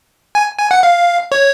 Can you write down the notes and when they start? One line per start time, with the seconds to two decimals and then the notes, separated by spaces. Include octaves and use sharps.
0.35 G#5
0.59 G#5
0.71 F#5
0.83 F5
1.32 C#5